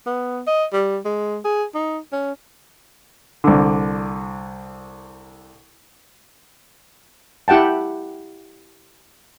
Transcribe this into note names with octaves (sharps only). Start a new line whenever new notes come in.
B3
D#5
G3
G#3
G#4
D#4
C#4
C2 D3
E4 G4 F#5 G5 A5